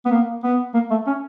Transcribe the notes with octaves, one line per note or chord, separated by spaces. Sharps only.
B3
A#3
B3
A#3
A3
C#4